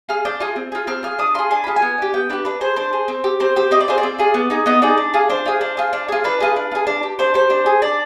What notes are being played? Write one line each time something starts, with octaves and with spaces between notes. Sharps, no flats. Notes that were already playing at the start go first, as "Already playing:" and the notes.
F4 G#4 F6
D4 G6
F4 G#4
C4
F4 G#4
C4 F6
F4 G#4 F6
D4 D#6
F4 G#4 C6
D4 G#5
F4 G#4 B5
G#5
B3
D4 G4
B3 G5
D4 G4 B4
D4 B4
G#4 C5
D4 C5
G#4
C4
G4
C4 C5
G4 C5
C4 D#5
D5
F4 G#4 C5
D5
C4
F4 G#4
B3
D#4 G#4
B3 D#5
D#4 G#4 D5
D4
F4 G#4
D4 C5
F4 G#4
D4
F4 G#4
D4
F4 G#4
D4 B4
F4 G#4
D4
F4 G#4
D4
G4
D4 C5
G4 C5
D4
G#4
D4 D5